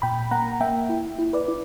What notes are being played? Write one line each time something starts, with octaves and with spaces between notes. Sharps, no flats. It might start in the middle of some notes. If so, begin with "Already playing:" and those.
A#2 G5 B5
A#3 F#5 A#5
A#3 E5 G5
E4
E4
B4 D5
E4